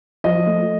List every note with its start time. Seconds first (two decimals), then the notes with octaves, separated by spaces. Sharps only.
0.24 F3 D#5
0.47 A3